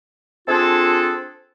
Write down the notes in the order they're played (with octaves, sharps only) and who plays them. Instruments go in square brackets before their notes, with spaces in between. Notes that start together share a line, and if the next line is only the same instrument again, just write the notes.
[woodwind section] C4 D4 F4 G#4 A4